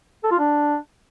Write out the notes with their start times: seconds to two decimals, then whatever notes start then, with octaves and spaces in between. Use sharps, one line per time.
0.23 A4
0.31 F4
0.39 D4